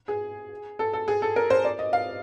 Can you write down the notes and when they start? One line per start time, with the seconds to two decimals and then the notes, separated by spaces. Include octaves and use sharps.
0.08 G#4
0.79 A4
0.93 A4
1.08 G#4
1.22 A4
1.36 A#4
1.50 C5
1.65 D5
1.79 D#5
1.93 F5